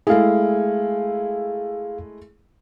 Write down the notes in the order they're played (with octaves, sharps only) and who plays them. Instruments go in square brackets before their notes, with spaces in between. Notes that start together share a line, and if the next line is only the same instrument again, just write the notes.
[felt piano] G#3 A3 E4 [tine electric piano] G#4 F5